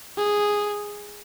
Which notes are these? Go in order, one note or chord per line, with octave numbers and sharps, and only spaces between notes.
G#4